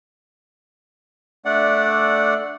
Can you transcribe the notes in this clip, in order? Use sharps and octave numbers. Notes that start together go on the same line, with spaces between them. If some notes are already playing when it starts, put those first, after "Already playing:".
A3 D4 D5 F#5